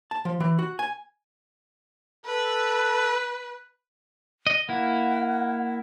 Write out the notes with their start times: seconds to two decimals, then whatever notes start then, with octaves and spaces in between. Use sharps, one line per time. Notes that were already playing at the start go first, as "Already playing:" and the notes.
0.11 A5
0.25 F3
0.40 E3
0.59 F#4
0.79 G#5
2.25 A4 B4
4.47 D#5
4.69 A#3 E4 F#5